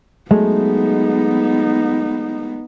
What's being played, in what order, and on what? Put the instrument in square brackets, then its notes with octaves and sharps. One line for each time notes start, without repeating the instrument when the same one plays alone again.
[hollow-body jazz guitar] F#3 G#3 A3 [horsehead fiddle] B3 D#4